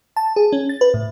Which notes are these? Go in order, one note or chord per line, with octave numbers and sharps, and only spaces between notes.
A5
G#4
C#4
A6
B4
A2